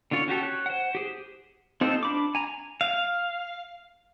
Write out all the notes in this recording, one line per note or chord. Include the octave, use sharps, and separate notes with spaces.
D3 C#4 F4 C#5
C#4 F#4 G4 A4
C#5 F#6
C5 F#5
G4 G#4 C5
C4 D#4 F4 G4 A4
D4 B5 D6
G#5 A#5
F5